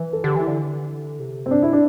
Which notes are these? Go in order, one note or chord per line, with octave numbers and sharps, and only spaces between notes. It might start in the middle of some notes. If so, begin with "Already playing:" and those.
Already playing: E3
A4
D3 G4
E3 E4
D3
C3
C4
D4
E4
D4